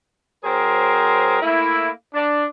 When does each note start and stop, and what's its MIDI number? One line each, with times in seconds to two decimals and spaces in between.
0.44 1.36 54
0.44 1.36 60
0.44 1.36 68
0.44 1.36 70
0.44 1.36 72
1.42 1.88 57
1.42 1.88 58
1.42 1.88 64
2.14 2.45 62